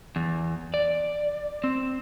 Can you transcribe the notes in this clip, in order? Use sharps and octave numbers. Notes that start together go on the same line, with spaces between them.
E2
D5
C4